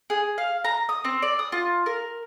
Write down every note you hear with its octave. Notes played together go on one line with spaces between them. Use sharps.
G#4
F5
A#5
D#6
C4
D5
D#6
F4
A#4